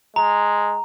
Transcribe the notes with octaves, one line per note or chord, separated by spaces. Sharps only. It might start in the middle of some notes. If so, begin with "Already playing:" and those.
G#3 A#5